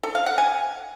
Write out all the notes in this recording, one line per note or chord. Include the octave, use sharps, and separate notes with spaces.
A4
F5
F#5
G#5